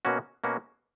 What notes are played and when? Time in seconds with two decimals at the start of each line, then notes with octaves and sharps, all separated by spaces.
0.05 B2 A#3 C#4 F#4
0.44 B2 A#3 C#4 F#4